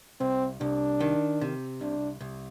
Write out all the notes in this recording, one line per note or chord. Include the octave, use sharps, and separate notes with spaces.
C2 C4
C2 D4
D#3
C3
C2 D4
C2